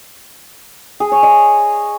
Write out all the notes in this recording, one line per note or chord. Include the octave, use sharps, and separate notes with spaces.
G#4
C#5
D#5